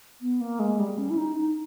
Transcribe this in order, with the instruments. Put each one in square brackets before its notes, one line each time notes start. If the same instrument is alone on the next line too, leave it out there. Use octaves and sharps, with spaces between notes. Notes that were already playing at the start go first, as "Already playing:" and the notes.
[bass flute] B3
A#3
G#3
G3
C#4
E4
D#4
D#4